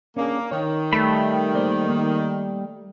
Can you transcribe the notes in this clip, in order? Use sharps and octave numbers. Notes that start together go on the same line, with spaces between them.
A#3 C#4 D4 G#4
D#3 C#5
G3 A3 B5
A#3 C5 D5
A#3